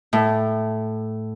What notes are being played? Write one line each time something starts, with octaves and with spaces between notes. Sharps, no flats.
A2